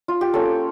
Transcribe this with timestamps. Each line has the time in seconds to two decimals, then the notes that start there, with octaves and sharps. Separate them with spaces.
0.08 F4
0.21 G4
0.34 A#3 C#4 F4 A4